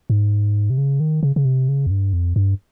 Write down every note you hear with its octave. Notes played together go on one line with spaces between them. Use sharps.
G#2
C3
C#3
D#3
C#3
C#3
C3
C#3
F2
G2
F2
G2